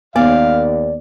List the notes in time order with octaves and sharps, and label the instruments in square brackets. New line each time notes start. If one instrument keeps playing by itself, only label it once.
[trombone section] D#2 [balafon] B3 [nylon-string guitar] D5 [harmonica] F5